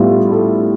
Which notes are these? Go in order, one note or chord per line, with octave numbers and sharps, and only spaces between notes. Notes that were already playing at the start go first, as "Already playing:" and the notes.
Already playing: A2 G3 B3 F4
A4